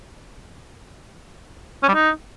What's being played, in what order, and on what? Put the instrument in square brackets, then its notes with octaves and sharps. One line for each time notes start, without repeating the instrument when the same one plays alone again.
[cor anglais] C#4
G3
D#4